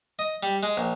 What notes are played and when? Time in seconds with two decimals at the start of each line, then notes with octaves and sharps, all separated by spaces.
0.19 D#5
0.43 G3
0.63 G#3
0.77 A#1